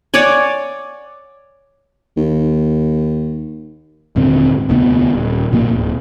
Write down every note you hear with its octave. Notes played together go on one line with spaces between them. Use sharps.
C#5 D5 F#5 G#5
D#2
D#1 G#2 D3 C4
E1 D2 C3 B3
D#1
A#1 G#2 B2 A#3
D1